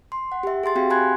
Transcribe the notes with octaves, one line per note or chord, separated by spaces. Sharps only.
C6
F#5
G4 E5
G#4 E5 C6 A6
C4 F#4 G4 F5 G5
G#5 B5 C6 F#6 G#6